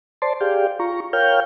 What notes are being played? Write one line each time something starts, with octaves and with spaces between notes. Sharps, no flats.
C5 D5 A5 C6
G4 G#4 D5 F5 G5
F4 A#5 C#6
A#4 C#5 F5 G5 F6 G6